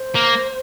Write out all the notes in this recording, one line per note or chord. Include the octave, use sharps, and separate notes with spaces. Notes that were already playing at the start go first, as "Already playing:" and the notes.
Already playing: C5
A#3